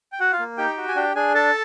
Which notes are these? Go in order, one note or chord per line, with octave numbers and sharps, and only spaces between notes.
G5
F#4 F#5
F4 F5
A#3
D#4 G4 G5
F#4
G#5
D4 G4 G5
D4 G#4 G#5
A4 A5